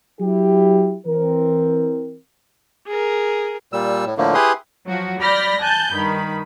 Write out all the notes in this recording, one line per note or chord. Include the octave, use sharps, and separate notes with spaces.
F#3 E4 G4
E3 C4 A#4
G#4 A#4
A#2 G3 E6
A2
A2 D3 F3 A3 A#3
E4 G4 G#4 B4 C6 D#6
F3 F#3 F#4
D5 B5 F6 G6 A#6
G#5 A5 F#6 G6
G2 D#3 B5